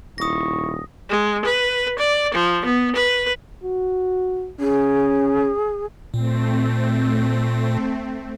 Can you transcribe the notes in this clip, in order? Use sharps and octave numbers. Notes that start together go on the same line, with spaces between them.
D#1 E4 C#6 D#6 A#6
G#3
B4
D5
F3
B3
B4
F#4
C#4 G#4
A#2 A3 C4